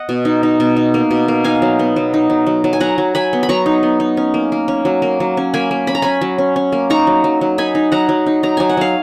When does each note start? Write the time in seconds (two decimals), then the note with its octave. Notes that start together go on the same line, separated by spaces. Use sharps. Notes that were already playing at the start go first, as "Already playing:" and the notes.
Already playing: D#5 F#5
0.09 B2
0.25 D#4
0.43 D#4
0.60 B2
0.77 D#4
0.94 A#3
1.11 B2
1.28 A#3
1.44 D#4 F5 G#5
1.62 F#3
1.79 B3
1.96 F#3
2.14 D#4
2.30 F#3
2.47 F#3
2.64 F#3
2.73 G#5
2.80 F#3 F#5 A#5
2.98 F#3
3.15 F#3 G#5 B5
3.33 B3
3.43 B5
3.49 F#3 A#5 C#6
3.66 D#4
3.83 B3
4.00 D#4
4.17 C#4
4.34 A#3
4.52 A#3
4.68 C#4
4.85 F#3
5.02 A#3
5.20 F#3
5.37 C#4
5.54 A#3 G#5 B5
5.71 A#3
5.87 C#4 B5
5.95 A#5
6.02 C#4 G#5 B5
6.21 F#3
6.38 C#4
6.56 C#4
6.72 A#3
6.90 D#4 A#5 C#6
7.07 F#3
7.24 F#3
7.41 F#3
7.58 D#4 G#5 B5
7.75 D#4
7.92 F#3 F#5 A#5
8.09 F#3
8.26 D#4
8.43 F#3 A#5
8.57 F#3 G#5
8.69 F#5
8.77 F#3 F5